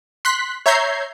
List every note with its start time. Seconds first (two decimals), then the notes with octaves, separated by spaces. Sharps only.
0.25 C6 F#6 B6
0.66 C#5 E5 A#5 G6 G#6 C7